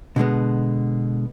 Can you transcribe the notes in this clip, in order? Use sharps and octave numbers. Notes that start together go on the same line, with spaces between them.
B2 D3 G#3 B3